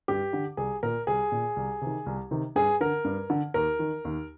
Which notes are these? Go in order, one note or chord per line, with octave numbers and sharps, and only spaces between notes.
G2 G4
D3
C2 G#4
A#2 A#4
C2 G#4
A#2
C2
C3 D#3
C2
C3 D#3
G2 G#4
D3 A#4
G2
D3
D#2 A#4
D#3
D#2